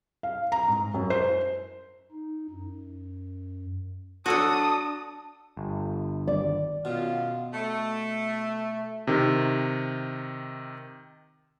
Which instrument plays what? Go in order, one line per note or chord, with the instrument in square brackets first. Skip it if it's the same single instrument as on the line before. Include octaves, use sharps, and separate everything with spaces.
[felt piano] F5
A#5
G#2
F#2
C5
[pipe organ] D#4
F#2
[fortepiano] F#3 A4 [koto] D4 F#4 [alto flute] A5 [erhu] D#6
[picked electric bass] G1
[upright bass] D#3 [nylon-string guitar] D5
[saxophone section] F#2 F4 [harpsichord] B2
[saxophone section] A3
[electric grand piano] C3 D#3